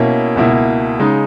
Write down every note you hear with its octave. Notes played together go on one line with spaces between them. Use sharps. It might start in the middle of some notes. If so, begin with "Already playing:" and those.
Already playing: B2 A#3 C#4 E4
C#2 B2 A#3 E4
C#3 G#3 D#4